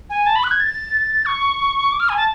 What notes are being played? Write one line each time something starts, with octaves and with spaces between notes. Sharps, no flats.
G#5
A5
B5
F#6
G#6
A6
C#6
D6
F6
G#5
A5